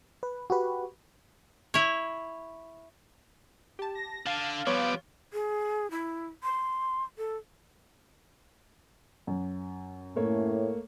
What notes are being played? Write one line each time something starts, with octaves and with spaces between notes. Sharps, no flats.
B4
F#4 G4 B4
E4 C#5
G4 A5
A#6
D3 F5 A5
F3 G3 B3 C#5 D6
G#4
E4
C6
A4
F#2
A2 A3 A#3 C#5